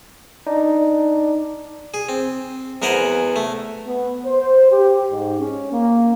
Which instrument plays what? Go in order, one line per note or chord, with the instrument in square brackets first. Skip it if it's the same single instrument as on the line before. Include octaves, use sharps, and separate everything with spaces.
[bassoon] D4 [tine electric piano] D#4
[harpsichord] G#4
C4
E2 B3 A#4 C5 F#5 G#5
A3
[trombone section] B3
C5
G4
G#2
C#4
A#3